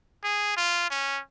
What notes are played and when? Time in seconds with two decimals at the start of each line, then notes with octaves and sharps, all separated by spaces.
0.23 G#4
0.56 F4
0.90 C#4